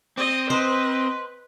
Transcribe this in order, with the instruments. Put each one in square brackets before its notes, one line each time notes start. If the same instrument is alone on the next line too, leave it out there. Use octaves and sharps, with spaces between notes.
[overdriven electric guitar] C4 [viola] D#5
[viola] B4 [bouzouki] C5 [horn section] D#5